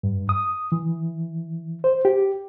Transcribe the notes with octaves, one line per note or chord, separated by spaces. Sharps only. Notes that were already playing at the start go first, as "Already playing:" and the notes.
G2
D#6
E3
C5
G4